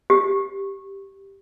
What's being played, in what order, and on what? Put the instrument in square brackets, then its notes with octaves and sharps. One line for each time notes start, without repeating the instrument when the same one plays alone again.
[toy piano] G4